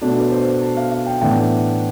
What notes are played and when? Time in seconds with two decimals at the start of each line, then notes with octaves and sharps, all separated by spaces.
0.01 B2 A3 D4
0.21 B4
0.32 C5
0.61 A5
0.77 F5
0.91 F5
1.06 G5
1.21 A2 E3 B3 D4 G5